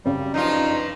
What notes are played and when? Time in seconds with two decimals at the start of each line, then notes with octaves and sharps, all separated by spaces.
0.05 F#2 C#3 G3
0.34 G2 F3 D#4 F4